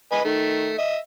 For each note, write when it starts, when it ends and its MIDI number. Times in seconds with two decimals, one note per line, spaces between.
0.12 0.20 71
0.12 0.20 75
0.12 0.20 80
0.25 0.74 51
0.25 0.74 57
0.78 0.97 75
0.78 0.97 76